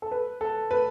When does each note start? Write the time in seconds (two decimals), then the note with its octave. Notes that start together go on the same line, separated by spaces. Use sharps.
0.02 A4
0.11 B4
0.41 A4
0.71 B4